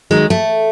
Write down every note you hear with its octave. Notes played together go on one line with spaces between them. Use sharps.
D#3 F#3 G#3
A3